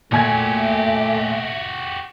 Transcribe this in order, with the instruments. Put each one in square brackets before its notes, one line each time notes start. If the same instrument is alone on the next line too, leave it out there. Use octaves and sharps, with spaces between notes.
[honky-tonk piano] A#2 G#5 G#6 [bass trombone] A3 [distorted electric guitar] F#4 G4 [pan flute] E5